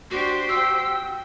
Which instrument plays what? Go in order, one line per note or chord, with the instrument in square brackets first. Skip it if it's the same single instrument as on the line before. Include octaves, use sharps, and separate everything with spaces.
[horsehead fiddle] D4 [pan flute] F#4 [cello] G4 C5
[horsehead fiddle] F#4 G5 [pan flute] E6